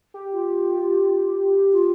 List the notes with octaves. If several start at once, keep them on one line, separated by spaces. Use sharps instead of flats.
G4
F4
F4